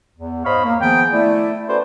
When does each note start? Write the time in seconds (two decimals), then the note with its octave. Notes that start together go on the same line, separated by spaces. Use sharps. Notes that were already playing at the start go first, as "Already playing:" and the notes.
0.16 E2
0.45 G#2 C5 C#5 D#5 F5 B5
0.65 A#3
0.81 D#3 F3 B3 G#4 G5
1.12 A3 E4 D5
1.68 C#4 F#4 A4 B4 C5 D5